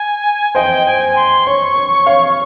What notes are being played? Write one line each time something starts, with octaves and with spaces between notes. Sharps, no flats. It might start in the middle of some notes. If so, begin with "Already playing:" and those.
Already playing: G#5
C5 D#5 G5
G#5
C6
C#5 C#6
C#5
C#5 F5